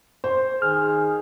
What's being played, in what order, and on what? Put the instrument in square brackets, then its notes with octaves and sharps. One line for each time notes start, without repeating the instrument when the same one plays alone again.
[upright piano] C5
[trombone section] D#3 G#4 [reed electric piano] F6